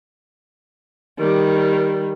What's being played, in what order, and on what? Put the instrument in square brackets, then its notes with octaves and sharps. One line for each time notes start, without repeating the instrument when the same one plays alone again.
[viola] D#3 G3